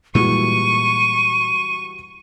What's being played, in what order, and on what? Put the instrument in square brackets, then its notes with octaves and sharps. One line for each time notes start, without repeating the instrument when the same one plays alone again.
[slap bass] A#2 G#3 [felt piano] E3 G3 F#4 [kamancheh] C#6 [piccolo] D#7